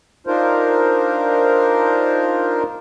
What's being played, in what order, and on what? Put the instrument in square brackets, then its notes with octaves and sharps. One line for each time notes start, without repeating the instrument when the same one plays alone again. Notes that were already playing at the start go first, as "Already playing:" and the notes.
[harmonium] D4 D#4 F4 A#4 C5